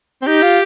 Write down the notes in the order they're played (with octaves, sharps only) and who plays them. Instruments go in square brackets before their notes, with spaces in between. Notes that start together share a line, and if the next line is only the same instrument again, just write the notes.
[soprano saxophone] C4
[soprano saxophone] D#4 [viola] G4
[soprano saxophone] F4